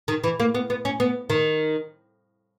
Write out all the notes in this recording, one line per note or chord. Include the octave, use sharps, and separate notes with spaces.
D#3
E3
A#3
B3
B3
C#4
B3
D#3